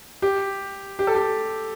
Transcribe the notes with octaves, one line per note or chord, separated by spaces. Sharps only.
G4
G4
A4
G4